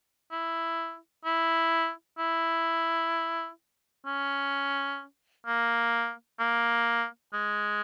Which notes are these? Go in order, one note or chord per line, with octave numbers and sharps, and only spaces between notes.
E4
E4
E4
C#4
A#3
A#3
G#3